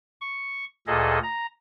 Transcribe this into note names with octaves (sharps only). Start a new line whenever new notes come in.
C#6
D2 A#2 G#4 A4 D#5
A#5